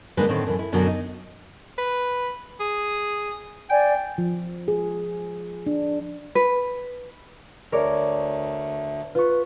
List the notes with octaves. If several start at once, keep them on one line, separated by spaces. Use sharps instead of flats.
D3 G#3 A#3 D4 D#4 B4
A2 D3 D#3 C4
F#2 E3
E4
F#2 B2 D3 F#3
D#4
B4
G#4
D5 G5 G#5
F3
G#4
D4
B4
D2 A#4 C#5 D5
F4 B4 C#6